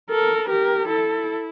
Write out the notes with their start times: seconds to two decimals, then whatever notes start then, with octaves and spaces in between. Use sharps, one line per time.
0.10 A4 A#4
0.49 G4 A#4
0.88 E4 A4